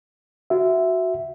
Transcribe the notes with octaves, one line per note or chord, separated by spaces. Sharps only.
F#4 E5